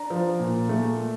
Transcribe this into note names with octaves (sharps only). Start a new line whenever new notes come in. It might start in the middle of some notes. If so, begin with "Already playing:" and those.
Already playing: D4 A#5
F3
A#2
A3